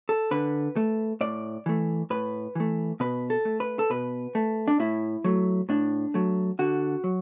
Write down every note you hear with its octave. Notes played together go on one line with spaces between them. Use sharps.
A4
D3 B4
A3
A2 D5
E3 A3
A2 B4
E3 A3
B2 B4
A4
A3
B4
A4
B2 B4
A3
D4
A2 E4
F#3 A3
A2 D4
F#3 A3
D3 F#4
F#3